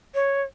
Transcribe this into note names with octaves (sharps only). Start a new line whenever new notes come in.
C#5